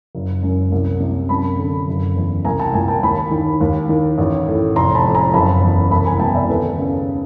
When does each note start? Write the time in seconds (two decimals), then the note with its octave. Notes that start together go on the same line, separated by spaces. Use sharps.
0.15 F#1
0.43 F#2
0.72 C2
1.00 C3
1.29 F#2 A5 B5
1.59 D3
1.88 F#1
2.16 E2
2.45 C2 G#5 A#5
2.59 G5 A5
2.74 A#2 G#5 A#5
2.88 G5 A5
3.03 D#2 A5 B5
3.31 D#3
3.61 D#2
3.89 D#3
4.18 A1
4.48 A2
4.76 F1 A#5 C6
4.95 A5 B5
5.05 F2
5.14 G#5 A#5
5.34 F#1 A5 B5
5.62 E2
5.91 C2 A5 B5
6.05 G#5 A#5
6.20 B2 G5 A5
6.34 D5 E5
6.48 D#2 A4 B4
6.78 C#3